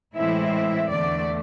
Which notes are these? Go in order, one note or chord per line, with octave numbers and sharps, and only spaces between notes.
A2 E3 G#3 C4 E4 E5
E5
E2 D3 A3 D5